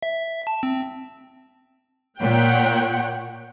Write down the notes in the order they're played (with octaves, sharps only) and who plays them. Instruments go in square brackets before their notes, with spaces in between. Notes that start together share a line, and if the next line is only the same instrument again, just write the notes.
[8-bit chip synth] E5
A5
C4
[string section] A#2 [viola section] C#5 F#5 G5